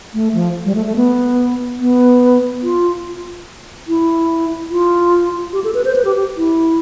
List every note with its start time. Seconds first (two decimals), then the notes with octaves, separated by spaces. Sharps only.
0.14 A3
0.34 F3
0.65 G3
0.75 A3
0.86 A3
0.96 B3
1.79 B3
2.63 F4
3.88 E4
4.71 F4
5.53 G4
5.64 A4
5.74 B4
5.85 C5
5.96 B4
6.05 G4
6.16 G4
6.37 E4